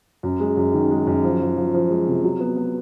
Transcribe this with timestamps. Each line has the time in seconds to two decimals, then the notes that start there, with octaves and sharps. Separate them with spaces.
0.23 F#2
0.40 G#3
0.57 F#2
0.74 D#3
0.91 G#3
1.07 F#2
1.24 F3
1.41 F3
1.57 F3
1.74 F3
1.90 G#3
2.07 C3
2.24 F#3
2.40 B3
2.57 B3